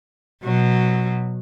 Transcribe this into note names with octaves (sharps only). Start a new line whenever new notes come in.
B2 F#3